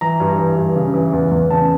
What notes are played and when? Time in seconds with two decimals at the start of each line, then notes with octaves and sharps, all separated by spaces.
0.01 E3 A#5
0.20 G2
0.38 E3
0.57 G2
0.76 C#3
0.94 E3
1.13 E2
1.31 E2
1.51 C#3 A5